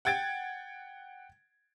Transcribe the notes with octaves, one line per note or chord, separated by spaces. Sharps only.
F#5 G5 G#6 A6 D7